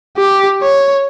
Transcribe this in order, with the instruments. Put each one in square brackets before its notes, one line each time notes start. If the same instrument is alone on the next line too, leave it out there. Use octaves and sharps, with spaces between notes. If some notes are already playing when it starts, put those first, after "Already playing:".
[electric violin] G4
C#5